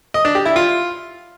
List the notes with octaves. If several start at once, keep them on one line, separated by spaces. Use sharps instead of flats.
D#5
D4
G4
E4
F4